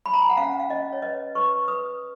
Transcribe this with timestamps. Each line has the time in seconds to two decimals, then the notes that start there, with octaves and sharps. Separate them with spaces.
0.06 B5
0.14 A#5
0.22 G#5
0.30 F#5
0.37 C#4 F5
0.60 F5
0.70 C#4 D#5
0.93 C#5
1.02 B4 D#5
1.35 B4 C#6
1.68 B4 D#6